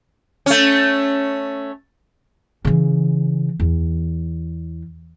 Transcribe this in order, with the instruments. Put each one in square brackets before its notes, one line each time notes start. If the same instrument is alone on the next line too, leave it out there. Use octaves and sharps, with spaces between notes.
[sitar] A3 C#4
[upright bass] C#3 E3
E2